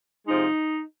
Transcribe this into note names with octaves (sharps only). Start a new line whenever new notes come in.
C3 F3 G#3 D#4